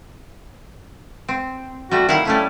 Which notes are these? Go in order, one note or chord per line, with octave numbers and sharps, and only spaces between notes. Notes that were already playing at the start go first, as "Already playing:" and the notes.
C4
G3 A3 F#4
D#3 E4 F5 F#5
G3 A3 C#4 E4